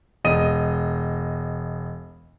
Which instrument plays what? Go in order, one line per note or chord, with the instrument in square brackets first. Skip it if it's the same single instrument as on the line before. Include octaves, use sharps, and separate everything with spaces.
[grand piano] E1 D#5 D#7